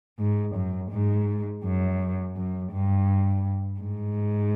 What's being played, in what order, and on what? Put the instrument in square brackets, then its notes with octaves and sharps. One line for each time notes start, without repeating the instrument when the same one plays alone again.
[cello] G#2
F#2
G#2
F#2
F#2
G2
G#2